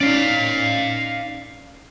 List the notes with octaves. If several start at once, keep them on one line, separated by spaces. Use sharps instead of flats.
C#4 D#4 D5 F5